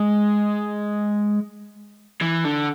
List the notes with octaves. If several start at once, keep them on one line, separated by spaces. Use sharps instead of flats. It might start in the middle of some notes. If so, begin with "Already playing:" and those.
Already playing: G#3
E3
D3